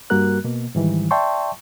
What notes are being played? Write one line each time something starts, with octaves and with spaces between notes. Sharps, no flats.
G2 G3 A#3 F#4 A#4 F#6
B2 A#3
G#2 D#3 E3 G3
D5 E5 G5 A5 C6 C#6